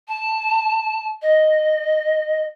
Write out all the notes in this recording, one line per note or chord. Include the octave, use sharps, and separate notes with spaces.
A5
D#5